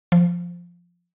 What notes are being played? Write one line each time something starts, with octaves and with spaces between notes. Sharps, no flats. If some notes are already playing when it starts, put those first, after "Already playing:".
F3